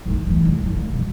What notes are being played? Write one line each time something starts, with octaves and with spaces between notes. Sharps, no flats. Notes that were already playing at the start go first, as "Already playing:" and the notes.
A1 D#2
D#3 E3
C2
F1 G#2
A#3
B2 G3